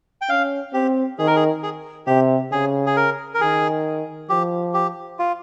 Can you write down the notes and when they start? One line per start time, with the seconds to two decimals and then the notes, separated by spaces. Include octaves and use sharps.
0.21 G5
0.29 C#4 F5
0.73 C4 G4
1.18 D#3 G#4
1.27 A#4
1.36 G#4
1.63 G#4
2.07 C3 G4
2.52 C#3 G#4
2.86 G#4
2.96 A#4
3.34 A#4
3.41 D#3 G#4
4.29 F3 G4
4.74 G4
5.19 F4